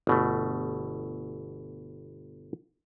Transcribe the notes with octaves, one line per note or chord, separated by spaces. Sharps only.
G1 B2 A3